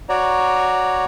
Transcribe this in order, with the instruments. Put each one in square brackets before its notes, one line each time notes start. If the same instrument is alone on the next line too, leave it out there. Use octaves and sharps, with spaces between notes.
[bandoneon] F#4 C#5 D5 A#5